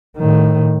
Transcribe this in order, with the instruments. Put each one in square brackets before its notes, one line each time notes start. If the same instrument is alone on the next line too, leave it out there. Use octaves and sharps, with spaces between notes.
[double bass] A2 D#3